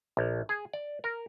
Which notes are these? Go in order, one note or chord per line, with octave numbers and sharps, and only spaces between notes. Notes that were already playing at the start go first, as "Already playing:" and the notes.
A#1
G#4
D5
A#4